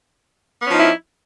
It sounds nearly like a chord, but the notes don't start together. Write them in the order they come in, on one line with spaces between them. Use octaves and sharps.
B3 C#4 F3 D#4 E4